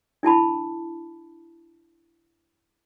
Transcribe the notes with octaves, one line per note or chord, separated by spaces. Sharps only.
D4 E4 A5 B5